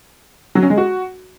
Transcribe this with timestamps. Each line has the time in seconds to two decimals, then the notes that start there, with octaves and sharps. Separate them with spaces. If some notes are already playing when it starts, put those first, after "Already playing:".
0.55 F#3
0.63 C#4
0.70 G#3
0.78 F#4